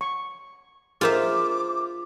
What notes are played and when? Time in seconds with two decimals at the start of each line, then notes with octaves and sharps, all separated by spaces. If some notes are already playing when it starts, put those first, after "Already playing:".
0.01 C#6
1.01 F4 G#4 A#4 C5 E5 D6